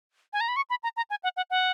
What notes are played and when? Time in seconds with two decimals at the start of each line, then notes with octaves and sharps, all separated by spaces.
0.33 G#5
0.41 A#5
0.48 B5
0.56 C#6
0.70 B5
0.83 A#5
0.97 A#5
1.10 G#5
1.23 F#5
1.37 F#5
1.50 F#5